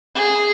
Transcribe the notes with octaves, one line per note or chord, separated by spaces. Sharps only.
G#4